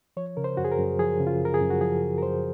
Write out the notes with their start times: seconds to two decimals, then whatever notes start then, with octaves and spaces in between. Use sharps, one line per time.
0.17 F3 C#5
0.37 C#3 A#4
0.44 C5
0.57 F#2 F#4
0.64 G#4
0.72 A#4
0.79 F#2
0.99 F3 G#4
1.20 C#3
1.27 F4
1.40 F#2
1.45 A#4
1.54 G#4
1.61 F#2
1.70 F#4
1.81 F3 G#4
2.02 C#3
2.18 A#4
2.22 F#2 C5